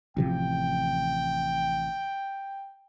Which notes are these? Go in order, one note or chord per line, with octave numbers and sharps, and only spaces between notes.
A1 C3 F3 G5